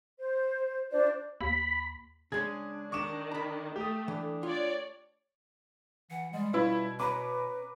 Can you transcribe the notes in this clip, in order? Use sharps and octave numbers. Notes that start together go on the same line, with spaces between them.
C5
D4 F4 C5 D5
D#2 B5
C#3 G#3 C#4 D4 G#4 G#6
D#3 C#6 D6 E7
A#5 B5
A3 G4 D#6
E3 D4
F4 C#5 D5
E3 F#5
G3 G#3
B2 C#4 E4 F4 B4 E5
C#4 B4 A#5 B5 D6